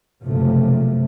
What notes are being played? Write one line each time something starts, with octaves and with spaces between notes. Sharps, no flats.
F#1 B1 C3 F3 A3